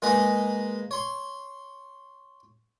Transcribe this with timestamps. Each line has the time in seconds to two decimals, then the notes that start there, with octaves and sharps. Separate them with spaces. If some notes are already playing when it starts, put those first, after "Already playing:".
0.02 G#3 A#3 D#4 G#4 B4 D#5
0.91 C#5 C6